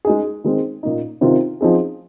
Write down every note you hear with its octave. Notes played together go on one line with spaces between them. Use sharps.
G#3 D#4 G#4
D#3 G#3 C4
A#2 A#3 D#4
C3 D#3 C4 F4
F3 C4 D#4 G#4